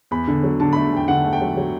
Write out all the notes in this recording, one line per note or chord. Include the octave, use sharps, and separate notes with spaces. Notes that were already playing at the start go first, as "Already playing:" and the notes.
E2 B5
D3
F#3
D3 A5
A3 B5
E2 G5
D3 F#5
A3
G5
F#3
F#3